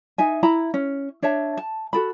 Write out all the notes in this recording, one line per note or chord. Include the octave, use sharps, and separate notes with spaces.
D#4 E5 G#5
E4 A#5 B5
C#4
D4 C#5 E5 A5
A5
F#4 A4 B5